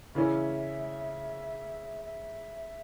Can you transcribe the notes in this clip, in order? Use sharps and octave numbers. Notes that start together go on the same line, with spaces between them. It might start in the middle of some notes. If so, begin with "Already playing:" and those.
C#3 E3 C#4 E4 E5
E5